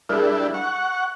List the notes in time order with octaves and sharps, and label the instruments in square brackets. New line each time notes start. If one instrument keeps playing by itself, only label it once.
[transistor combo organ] G3 D4 E4 [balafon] G#4 A#4
[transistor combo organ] F#5 C#6